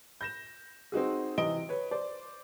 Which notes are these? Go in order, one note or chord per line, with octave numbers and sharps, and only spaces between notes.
G6 A#6 E7
C4 D#4 F#4 G#4
C3 E3 D#5 D7 G7
B4 C#5
C5 D5